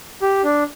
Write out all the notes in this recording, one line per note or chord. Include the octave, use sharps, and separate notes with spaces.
G4
D4